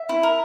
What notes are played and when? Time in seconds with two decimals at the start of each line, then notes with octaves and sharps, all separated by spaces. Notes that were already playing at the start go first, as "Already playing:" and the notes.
Already playing: E5
0.09 E4
0.23 A#4